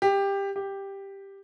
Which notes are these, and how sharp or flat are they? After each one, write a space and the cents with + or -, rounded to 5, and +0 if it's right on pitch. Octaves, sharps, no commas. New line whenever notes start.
G4 +15
G4 +5